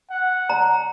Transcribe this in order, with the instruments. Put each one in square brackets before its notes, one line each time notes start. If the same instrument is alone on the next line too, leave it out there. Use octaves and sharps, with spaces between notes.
[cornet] F#5
[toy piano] A#5